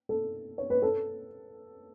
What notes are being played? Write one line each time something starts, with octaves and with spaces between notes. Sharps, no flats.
A4
C#5
B4
A4